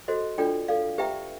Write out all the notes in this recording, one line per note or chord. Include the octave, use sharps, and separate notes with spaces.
F#4 A4 C5 D#5
D4 F4 A4 D5 G5
A4 D5 F5
G4 B4 E5 G5 A#5